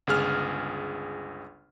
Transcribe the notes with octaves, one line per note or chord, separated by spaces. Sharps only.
G1 C#2 G#4 F6